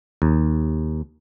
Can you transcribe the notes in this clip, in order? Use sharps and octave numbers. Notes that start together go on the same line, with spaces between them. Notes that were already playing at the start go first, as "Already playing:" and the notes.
D#2